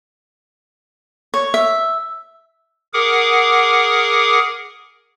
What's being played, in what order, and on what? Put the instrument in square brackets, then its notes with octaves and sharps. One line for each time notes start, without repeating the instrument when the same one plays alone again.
[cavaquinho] C#5
E5
[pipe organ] G#4 A#4 F#5 D6 D#6